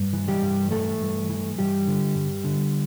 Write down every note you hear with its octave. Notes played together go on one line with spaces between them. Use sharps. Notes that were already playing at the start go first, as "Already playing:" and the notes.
Already playing: G2
E3
G3 G4
G2
E3 A3 A4
G2
E3
G2 G3 G4
D3
G2
D3